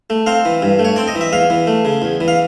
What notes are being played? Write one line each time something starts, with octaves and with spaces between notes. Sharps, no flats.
A3
C4 F5
E3
G2
A3
C#5
C4 D5
D#5
E3
E5
E2 F5
E3
A3
C#3
E2
E3
F5